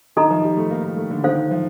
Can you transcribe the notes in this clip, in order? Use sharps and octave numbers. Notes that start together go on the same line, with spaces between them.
D#3 D#4 A4 D#5 A#5
F3
G3
A3
A#3
A#3
A3
D3
D#3 A4 C5 F5
F3